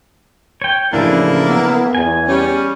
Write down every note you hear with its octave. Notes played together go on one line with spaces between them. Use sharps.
C#5 G5
A1 C#3 F3 A#3 D4 E4
B3
E2 G#5
G3 C#4